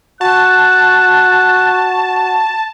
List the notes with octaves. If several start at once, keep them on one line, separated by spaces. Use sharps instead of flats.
F#4 A5 F#6